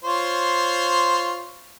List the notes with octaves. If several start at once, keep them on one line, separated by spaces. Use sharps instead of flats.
F4 C5 C#5